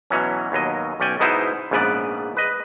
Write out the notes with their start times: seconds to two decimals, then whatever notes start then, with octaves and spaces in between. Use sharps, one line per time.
0.10 B2 E3 F#3 C#4
0.52 D#2 B2 F#3 D#5
1.00 B1 C#4 D5 G5 G#5
1.20 G#2 B2 B3 D#4 E4 C5
1.71 A#1 G#2 C#3 B3 B4 D5
2.37 B4 D#5